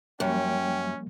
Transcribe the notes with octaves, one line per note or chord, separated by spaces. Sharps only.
F#2 F3 G3 A#3 C#4 G5